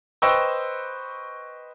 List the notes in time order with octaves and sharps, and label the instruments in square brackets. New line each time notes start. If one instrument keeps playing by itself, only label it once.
[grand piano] B4 C5 D#5 G5 C#6 E6